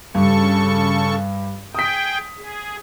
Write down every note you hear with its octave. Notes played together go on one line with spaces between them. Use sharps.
G2 C#3 A4 C#6
G#4 G5 D#6 B6
G#4